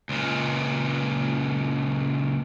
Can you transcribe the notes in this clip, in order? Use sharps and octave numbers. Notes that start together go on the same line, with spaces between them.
C#2 A#2